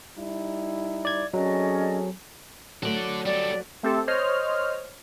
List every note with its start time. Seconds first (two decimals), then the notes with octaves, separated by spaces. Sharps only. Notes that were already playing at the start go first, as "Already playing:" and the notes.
0.17 G3 D#4 E4
1.05 D5 G#6
1.34 F#3 C4 C#4 G#4 A4 D5 D#5
2.83 F#3 A3 A4 D5
3.26 G3 A4 D5
3.83 A3 C4 G4 A4
4.07 C5 C#5 D#5 F6